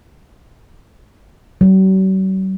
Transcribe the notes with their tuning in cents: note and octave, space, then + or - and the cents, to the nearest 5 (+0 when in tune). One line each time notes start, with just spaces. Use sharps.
F#3 +45